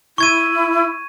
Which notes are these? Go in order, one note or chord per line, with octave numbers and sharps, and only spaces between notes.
E4 C#6 G#6 D#7